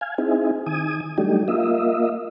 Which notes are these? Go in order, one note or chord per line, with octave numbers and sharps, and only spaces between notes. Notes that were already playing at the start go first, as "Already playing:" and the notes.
F5 G#5
C4 D#4 E4 G#4
D#3 G#5 D#6
F#3 G3 A3 D4 D#4 G4
A#3 F4 D#5 E5